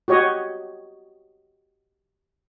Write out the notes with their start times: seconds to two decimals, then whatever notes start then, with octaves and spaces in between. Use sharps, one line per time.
0.08 F#4 G4 C#5 D#5